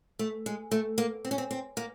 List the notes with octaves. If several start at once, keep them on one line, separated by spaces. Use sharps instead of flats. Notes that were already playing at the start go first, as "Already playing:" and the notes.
A3
G#3
A3
A#3
C4
C#4
C4
C4
A#3